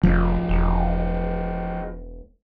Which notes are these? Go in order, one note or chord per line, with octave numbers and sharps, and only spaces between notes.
F1 F3 C#4
E1